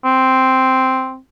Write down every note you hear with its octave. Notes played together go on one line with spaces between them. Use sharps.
C4